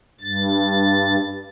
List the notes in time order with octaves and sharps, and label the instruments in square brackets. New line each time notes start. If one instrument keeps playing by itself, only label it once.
[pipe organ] G2 A6